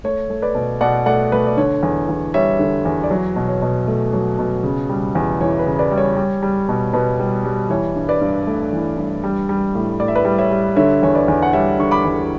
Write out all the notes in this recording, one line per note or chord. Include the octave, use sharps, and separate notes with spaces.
A3 C#5
A3
B4 D5
B2
B2 D5 F#5
A3 D5 F#5
A3 B4
D5
D3 C#5
E2
E2
G3 C#5 E5
D3
E2
D5
F#3 C#5
B2
C#5
B2
A3
F#3
B2
C#3
G3
E2
E3 C#5
B4
C#3
B4 D5
G3
C#5
G3
G3
B2
B2 B4
G3
G3
E3 C#5
G2
B4 D5
G2
A3
E3
G2
G3
G3
A2
A2 D5
E5
B4 D5
G3
C#5 E5
G3
D3 C#5 E5
E2 C#5
B4 D5
E2
F#5
G3 C#5 E5
D3 C#6
B5 D6
E2